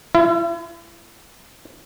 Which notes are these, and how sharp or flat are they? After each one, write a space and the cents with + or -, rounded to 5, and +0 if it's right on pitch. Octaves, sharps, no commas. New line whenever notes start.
E4 +40